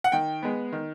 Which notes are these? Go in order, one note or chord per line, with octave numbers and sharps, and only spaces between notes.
F#5
D#3 G5
G#3 B3
D#3